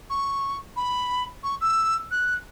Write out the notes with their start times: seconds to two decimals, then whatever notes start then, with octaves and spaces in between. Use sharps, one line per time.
0.10 C#6
0.76 B5
1.43 C#6
1.61 E6
2.11 F#6